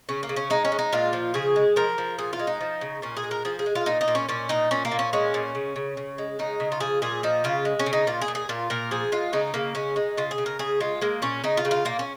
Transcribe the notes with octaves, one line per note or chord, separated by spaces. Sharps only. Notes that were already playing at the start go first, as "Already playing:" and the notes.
C#3 C#4
A#3
C#3
C#4
G#3 D#4
C#4
G#3
D#4
A#2 F4
F3
C#3 G#4
G#3
F3 A#4
F3
A#2 G#4
F4
G#3
D#4
F3
C#3
A#2 C#4
G#4
G#3
A#4
F3 G#4
G#4
G#3
F4
A#2 D#4
D#4
A#2
C#4
A#2 C#4
A#2 D#4
A#2 C#4
A#3
A#2
C#4
G#3 C#4
A#2
C#3
C#3
C#3
G#3
C#3 D#4
C#3
F4
F3 G#4
A#2 G#4
F3 D#4
C#3 F4
G#3
C#4
C#3
D#4
A#2 F4
G#4
A#2
G#4
A#2 F4
A#2 A#4
F3 G#4
G#3 F4
C#3 D#4
C#3 A#3
G#3 C#4
G#3 D#4
C#3 F4
G#4
C#3
A#4
C#3 G#4
G#3 F4
G#3 A#3
A#2 C#4
C#3 D#4
F4
C#3
F4
A#2 A#3
C#4